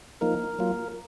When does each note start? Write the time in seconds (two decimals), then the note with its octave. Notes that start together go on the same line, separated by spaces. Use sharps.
0.21 F3 A#3 D#4 A#4
0.59 F#3 A#3 F4